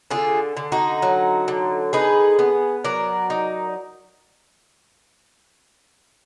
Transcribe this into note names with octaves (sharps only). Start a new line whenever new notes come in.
D3 F4 G#4
D3
D#4 F#4
F#3
D3
D#4 G#4 B4
B3
F#3 A#4 D5
D#4